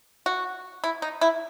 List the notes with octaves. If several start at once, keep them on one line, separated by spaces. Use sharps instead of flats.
F#4
E4
D#4
E4